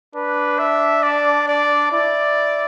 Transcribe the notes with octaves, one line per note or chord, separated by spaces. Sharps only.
D4 B4
E5
D5
D5
E4 D5